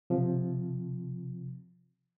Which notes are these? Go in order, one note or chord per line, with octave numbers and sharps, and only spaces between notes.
C3 F3